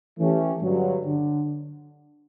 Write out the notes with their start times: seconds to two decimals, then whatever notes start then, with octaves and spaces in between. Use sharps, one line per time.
0.17 E3 A3 C#4 G4
0.61 G2 D3 F#3
1.05 D3